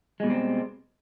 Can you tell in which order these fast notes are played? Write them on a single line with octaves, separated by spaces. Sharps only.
G#3 B2 G3 C4